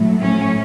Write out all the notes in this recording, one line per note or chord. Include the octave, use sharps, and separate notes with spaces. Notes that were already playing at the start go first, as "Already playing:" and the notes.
Already playing: A2 F#3 A3
C#4